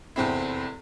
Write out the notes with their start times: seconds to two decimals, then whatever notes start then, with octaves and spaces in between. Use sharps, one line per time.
0.16 F1 E2 C4 E4